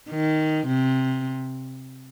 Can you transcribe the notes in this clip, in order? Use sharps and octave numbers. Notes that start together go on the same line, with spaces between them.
D#3
C3